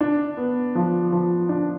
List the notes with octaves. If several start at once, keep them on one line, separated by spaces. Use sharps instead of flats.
D4
B3
F3
F3
D4